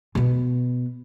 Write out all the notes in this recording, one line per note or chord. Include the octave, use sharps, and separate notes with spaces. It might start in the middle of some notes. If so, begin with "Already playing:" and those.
B2 B3